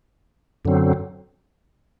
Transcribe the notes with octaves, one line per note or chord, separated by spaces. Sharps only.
F#2 D3 F#3 C4